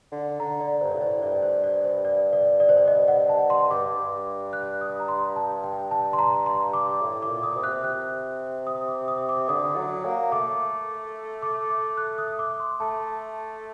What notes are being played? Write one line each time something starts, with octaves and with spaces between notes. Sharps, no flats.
D3
D3 A#5
D5
G2 C5
A2 D5
C5
G2 D5
C5
D5
C5
D5
D5
D5
C5
D5
D#5
F#5
A5
C6
G2 D6
G2
F#6
D#6
A#5
C6
A5
G5
A5
C6
A#5
C6
D6
A2
D6
A#2
D#6
C3
F#6
C3 F#6
D#6
D6
D#6
D6
D3 D#6
F#3
A#3
A3 D6
D6
D6
F#6
D#6
D6
C6
A3 A5